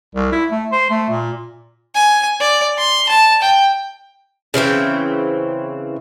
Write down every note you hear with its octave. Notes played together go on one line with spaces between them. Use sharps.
C2
E4
A3
C5
A3
A#2
G#5
D5
C6
A5
G5
C#3 E3 C4 G5